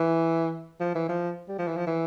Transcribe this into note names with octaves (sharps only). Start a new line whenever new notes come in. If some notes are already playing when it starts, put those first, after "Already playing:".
Already playing: E3
F3
E3
F3
G3
F3
E3
F3
E3